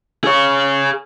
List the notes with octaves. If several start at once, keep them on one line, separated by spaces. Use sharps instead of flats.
G#4 C#5